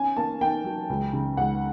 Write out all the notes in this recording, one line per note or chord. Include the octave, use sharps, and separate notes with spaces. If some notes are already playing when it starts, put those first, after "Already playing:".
Already playing: C#4 G#5
A#3 A5
A#3 G5
F#3
C#2
C#3
C#2 F#5